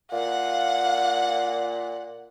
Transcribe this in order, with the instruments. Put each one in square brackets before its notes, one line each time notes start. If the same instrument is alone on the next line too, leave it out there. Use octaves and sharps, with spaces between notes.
[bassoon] A#2 [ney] F5 [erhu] F#5